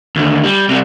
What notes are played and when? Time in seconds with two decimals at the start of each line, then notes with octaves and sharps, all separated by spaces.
0.16 D#2 D3
0.44 G3
0.69 C3 G3